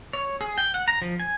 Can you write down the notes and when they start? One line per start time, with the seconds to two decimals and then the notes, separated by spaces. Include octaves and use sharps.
0.13 C#5
0.41 G#4
0.58 G5
0.74 F#5
0.88 A#5
1.02 F3
1.20 G#5